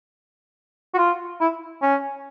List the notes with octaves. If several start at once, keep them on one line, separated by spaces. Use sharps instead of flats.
F#4
F4
E4
C#4